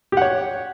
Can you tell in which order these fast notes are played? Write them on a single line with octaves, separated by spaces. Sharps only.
G4 F#5 C#5